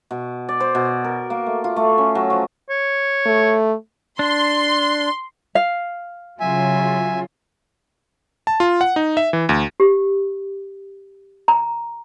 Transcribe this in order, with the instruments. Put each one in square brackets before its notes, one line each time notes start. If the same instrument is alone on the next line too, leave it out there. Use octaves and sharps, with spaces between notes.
[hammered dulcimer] B2
D5
C5
B2
A#4
A#3
A3
F4
A3
C#4
F#3
F3
[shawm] C#5
[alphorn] A3
[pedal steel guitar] D4 [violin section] C6
[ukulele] F5
[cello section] C#3 F#3 F4 [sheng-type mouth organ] E5 G#5
[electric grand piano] A5
F4
F#5
D#4
E5
E3
D2
[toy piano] G4
A#5